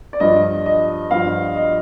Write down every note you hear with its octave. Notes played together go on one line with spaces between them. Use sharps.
D5
G2 F3 D#5
D#5
G2 F3 F5
D#5